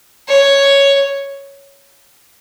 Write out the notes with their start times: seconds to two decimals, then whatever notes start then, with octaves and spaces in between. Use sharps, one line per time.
0.28 C#5